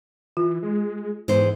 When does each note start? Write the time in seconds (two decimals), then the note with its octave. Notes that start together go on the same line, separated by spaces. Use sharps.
0.37 E3 F4
0.63 G#3
1.28 G#2 E3 B3 C5